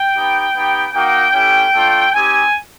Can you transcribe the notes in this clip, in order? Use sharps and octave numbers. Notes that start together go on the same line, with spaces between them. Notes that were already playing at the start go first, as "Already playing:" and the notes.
Already playing: G5
B3 D#4 G4
B3 D#4 G4
A#3 D#4 F#4 G5
A3 C#4 E4 G4
A3 D4 F4
C4 D#4 G4 G#5